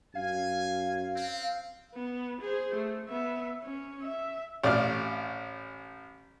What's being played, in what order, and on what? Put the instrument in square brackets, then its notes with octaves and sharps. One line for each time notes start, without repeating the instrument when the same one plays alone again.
[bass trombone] F#2 [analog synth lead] F5 [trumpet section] G#5
[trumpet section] C4
[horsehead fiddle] B3
G#4 C5
A3
B3 E5
C#4
E5
[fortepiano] A1 D5 F5 F6